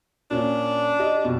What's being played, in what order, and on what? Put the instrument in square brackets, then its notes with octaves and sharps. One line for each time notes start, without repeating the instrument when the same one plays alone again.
[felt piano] A#2 C#4 [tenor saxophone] D4
[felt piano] G4 D#5
F2 B2